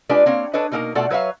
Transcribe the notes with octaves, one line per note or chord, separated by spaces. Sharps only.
G#3 D4 F4 G4 B4 D5
A#3 C4 C#5 F5
D4 A4 B4 C#5 D#5
B2 G3 A#3 D#4 A#4
B2 A3 F4 A4 D5 F#5
F#3 B4 C#5 E5 F5